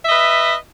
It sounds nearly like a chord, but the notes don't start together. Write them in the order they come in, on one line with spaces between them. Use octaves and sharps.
E5 D#5 B4